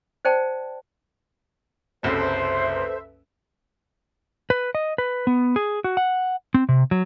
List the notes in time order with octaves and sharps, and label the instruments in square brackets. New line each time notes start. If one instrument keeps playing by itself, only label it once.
[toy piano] C5 D5 G5 A5
[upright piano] F#1 C2 F#2 [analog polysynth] A4 B4 E5 [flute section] C5
[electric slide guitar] B4
D#5
B4
B3
G#4
F#4
F#5
C4
C3
F#3